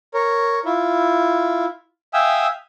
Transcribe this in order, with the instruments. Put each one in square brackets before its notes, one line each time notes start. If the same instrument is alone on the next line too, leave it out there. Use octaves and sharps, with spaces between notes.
[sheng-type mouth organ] A#4 C#5
E4 F4
E5 F5 G5 G#5 D#6 E6